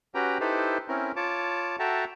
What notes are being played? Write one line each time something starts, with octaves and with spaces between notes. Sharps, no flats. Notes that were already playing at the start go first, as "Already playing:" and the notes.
C#4 F#4 G4 B4 G5 A#5
D#4 E4 G4 A4 B4 C5
C4 C#4 E4 A#4
F4 C#5 A5 D6
F#4 A4 E5 G5 A5 A#5